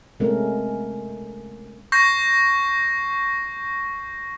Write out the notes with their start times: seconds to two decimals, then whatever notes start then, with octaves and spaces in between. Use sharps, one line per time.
0.20 C3 G#3 A3 B3 C#4 A#4
1.92 C#6 G6 A#6 C7